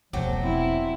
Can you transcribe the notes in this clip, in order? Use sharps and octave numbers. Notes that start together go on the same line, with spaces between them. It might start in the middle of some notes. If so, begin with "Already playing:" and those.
E1 F3 F#3 A3 G4
C4 E4